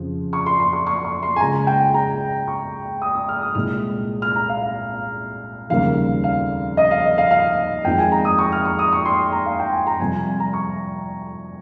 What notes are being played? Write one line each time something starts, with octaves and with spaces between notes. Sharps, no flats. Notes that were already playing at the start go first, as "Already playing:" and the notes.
Already playing: F2 C#3 F3
C#6
C6
C6
C#6
C#6
C#6
C6
G#5
C#2 C#3 G#3 A#5
G#5
G5
G#5
A#5
C#6
D#6
D#6
F6
D#6
C2 A#2 G#3 F6
F6
A#5
F5
F5
F1 D#2 C#3 G3 A#3 F5
F5
D#5
F5
D#5
F5
F5
F2 D#3 G#3 G5
G#5
A#5
D#6
C#6
F6
C#6
D#6
C#6
C6
A#5
F5
G5
G#5
A#5
F2 C3 G3 G#5
G#5
G#5
A#5
C#6